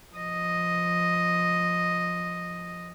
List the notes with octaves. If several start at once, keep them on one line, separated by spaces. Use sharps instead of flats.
F3 D#5